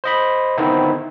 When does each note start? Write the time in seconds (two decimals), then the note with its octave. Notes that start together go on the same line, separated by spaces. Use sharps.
0.04 C5 D#5 B5
0.57 D3 D#3 B3 C4 D#4 E4